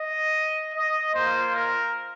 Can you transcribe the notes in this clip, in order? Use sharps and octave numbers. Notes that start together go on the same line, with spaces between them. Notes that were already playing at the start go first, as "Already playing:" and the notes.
Already playing: D#5
D#5
A#3 F4 C5
A#4